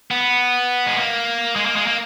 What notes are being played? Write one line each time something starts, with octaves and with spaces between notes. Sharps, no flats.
B3
G#3
A#3
G#3
A#3
G#3
A#3